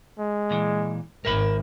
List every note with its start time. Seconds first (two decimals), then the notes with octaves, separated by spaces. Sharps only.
0.19 G#3
0.50 A#2 E3
1.25 G#1 A#4 E5 B5